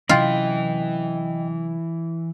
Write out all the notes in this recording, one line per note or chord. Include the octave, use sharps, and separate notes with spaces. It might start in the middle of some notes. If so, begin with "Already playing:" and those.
C3 E3 F#3 C#4 E4 F4 D#5 G5